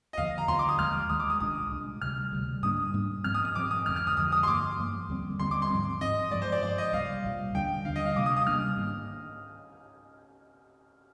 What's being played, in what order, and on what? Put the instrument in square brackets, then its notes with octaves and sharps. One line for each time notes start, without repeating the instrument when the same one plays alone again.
[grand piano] D#5
[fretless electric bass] D#2 D3 F3 [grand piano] F5
[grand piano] A#5
[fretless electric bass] D#2 D3 F3 [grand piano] C6
[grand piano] D6
D#6
[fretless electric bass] D#2 D#3 G#3 [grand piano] F6
[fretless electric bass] D#2 D#3 G#3 [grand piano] D#6
[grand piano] D6
D#6
[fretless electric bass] C2 A#2 G#3 D4 [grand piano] D#6
[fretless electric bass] C2 A#2 G#3 D4
[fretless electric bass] D2 C3 G3 [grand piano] F6
[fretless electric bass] D2 C3 G3
[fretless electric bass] G#2 G3 A#3 D4 [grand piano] D#6
[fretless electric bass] G#2 G3 A#3 D4
[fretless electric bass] G#2 F3 C4 [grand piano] F6
[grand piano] D#6
D#6
[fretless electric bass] G#2 F3 C4 [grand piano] D6
[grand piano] D#6
[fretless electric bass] F2 D3 F3 G#3 [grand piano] F6
[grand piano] F6
D#6
[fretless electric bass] F2 D3 F3 G#3 [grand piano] D#6
[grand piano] D#6
C6
[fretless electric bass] G2 F3 A#3 [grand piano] D6
[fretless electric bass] G2 F3 A#3
D#2 D3 G3 C4
[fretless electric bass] D#2 D3 G3 C4 [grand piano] C6
[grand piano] D6
C6
[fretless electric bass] G#2 F3 C4
[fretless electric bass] G#2 F3 C4 [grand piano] D#5
[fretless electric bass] G2 F3 G#3 [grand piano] D5
[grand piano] C5
D5
[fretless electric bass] G2 F3 G#3 [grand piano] D5
[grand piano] D#5
[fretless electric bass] C2 A#2 G3 [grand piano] F5
[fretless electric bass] C2 A#2 G3
[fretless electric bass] D#2 D3 G3 D4 [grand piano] G5
[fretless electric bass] D#2 D3 G3 D4 [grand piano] F5
[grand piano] D#5
F5
[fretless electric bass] C3 G3 A#3 D4 [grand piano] D6
[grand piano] D#6
D#6
[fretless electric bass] C3 G3 A#3 D4 [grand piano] F6
[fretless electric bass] G#2 D#3 A#3 D4